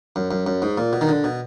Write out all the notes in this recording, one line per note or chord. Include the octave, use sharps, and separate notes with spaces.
F#2
F#2
F#2
G#2
A#2
B2
D#3
D3
B2